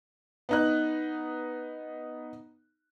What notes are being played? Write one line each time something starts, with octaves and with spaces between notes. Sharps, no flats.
B3 D#4 F#6